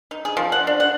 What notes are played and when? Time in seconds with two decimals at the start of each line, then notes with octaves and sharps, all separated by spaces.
0.11 D#4
0.25 G#4
0.37 F3
0.52 F#5
0.67 D4
0.80 F#5